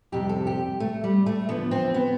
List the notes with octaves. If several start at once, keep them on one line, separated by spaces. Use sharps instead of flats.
F2 C3 G3 G4
A4
G4
A3
G3
A3
E2 D3 F3 B3
C4
B3